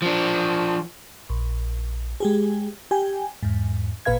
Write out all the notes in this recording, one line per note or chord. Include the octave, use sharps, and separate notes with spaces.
F3 D4
A#1
G#3 G4 G#4
G4 G5 G#5
E2 G#2
G#1 A#2 B4 F5 G#6